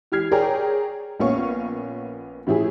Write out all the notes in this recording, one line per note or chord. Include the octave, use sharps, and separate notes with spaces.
E3 G4 F6 G#6 C7
G#4 A#4 C#5 D5 G5 A#5
A#1 A#3 B3 C#4 F5 C#6
A2 F3 E4 G4 G#4